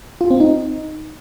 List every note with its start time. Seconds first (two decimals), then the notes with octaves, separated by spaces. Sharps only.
0.21 F4
0.30 C4
0.40 D#4